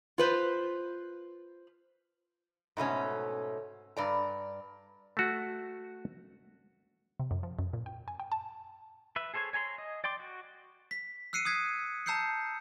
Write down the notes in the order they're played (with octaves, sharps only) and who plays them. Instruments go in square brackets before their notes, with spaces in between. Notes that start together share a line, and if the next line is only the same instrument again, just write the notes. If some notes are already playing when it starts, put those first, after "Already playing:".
[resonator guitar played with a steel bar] F4 B4 C5
G#2 B2 A3 C#4
G2 D5 A#5
[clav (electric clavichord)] A3 F#4
[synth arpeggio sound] C3
F#2
F3
F#2
A#2
G5
G#5
G5
A5
[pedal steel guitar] B4 E5
G#4 A4 C5 C#5 G#5
C#5 G#5 A#5 C6
D#5
D5 G5 C6 D6
F#4
[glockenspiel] B6
E6 F#6 C7 C#7 D#7
D#6 F#6 G#6 B6
A5 A#5 E6 G6 C7 C#7